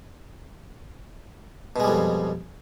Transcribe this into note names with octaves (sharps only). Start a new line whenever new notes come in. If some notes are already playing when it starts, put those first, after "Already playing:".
F2 B2 G3 G#3